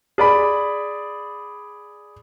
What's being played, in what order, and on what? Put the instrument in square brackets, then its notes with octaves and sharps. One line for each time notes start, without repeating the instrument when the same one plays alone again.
[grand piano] G#4 D5 B5